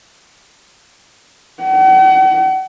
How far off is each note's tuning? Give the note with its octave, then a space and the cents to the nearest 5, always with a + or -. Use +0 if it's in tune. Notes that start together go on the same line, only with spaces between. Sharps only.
F#5 +45